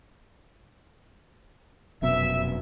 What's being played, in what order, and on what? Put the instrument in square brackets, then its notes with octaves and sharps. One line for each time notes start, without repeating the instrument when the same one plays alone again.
[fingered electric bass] F1 F#2 B2 [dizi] E5